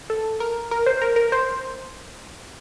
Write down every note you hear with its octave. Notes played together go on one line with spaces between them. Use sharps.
A4
A#4
A#4
C5
A#4
A#4
C5